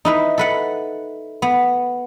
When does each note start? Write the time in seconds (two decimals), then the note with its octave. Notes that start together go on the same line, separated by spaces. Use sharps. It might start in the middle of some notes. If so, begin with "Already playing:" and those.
0.05 D#4 E4 B4
0.38 A4 B4 F#5
1.42 B3